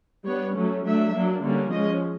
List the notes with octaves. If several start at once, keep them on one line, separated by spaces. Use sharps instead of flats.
G3 B3 D4 C#5
F#3 A3 C#4
F#3 A3 D4 E5
F#3 A#3 D4
D3 G3 A#3 C#4
F3 G#3 C#4 D#5